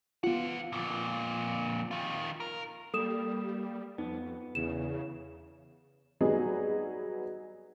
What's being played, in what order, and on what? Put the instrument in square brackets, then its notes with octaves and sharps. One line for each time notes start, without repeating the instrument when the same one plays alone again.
[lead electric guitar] E3 F#5 [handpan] B3 F4
[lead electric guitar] F2 A#2
D#3 F4
A#4
[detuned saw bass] G3 [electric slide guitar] A#3 [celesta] A4 D#6 E7
[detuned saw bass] F2 [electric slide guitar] B3 [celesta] D#4
[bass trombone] E2 [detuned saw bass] C#3 [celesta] E7
[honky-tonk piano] F#3 G3 B3 D#4 G#4